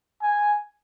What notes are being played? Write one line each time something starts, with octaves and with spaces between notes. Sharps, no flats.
G#5